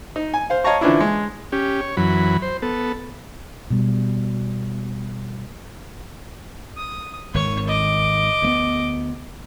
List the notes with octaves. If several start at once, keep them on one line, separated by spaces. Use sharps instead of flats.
D#4
G#5
C5 F5
C#5 D#5 F5 A5 A#5 C#6
D3 E3 F3 C#4 D4 E4
G#3
C#4 G4
C#5
F#2 E3 F#3 B5
C5
B3 A4
B2 G3
D#6
G#1 D#3 C#5
D#5 D6
D2 A3 B3